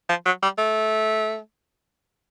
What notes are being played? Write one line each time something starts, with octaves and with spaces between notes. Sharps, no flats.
F3
F#3
G3
A3